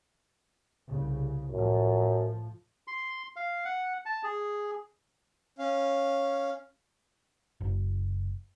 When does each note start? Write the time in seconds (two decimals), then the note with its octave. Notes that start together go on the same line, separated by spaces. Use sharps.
0.87 C2 C#3
1.51 F#2 A2 F3
2.88 C6
3.36 F5
3.65 F#5
4.06 A5
4.24 G#4
5.59 C#4 F5
7.61 F#1